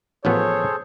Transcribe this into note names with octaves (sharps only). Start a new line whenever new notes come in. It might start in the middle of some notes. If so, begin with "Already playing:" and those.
A1 F3 B3 G#4 A4 C5 C#5